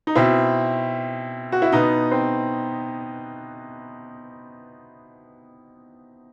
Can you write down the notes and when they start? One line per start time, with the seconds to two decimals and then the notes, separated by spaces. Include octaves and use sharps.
0.07 D#4
0.16 B2 C4 E4
1.52 F#4
1.62 E4
1.72 B2 B3 D#4
2.11 C4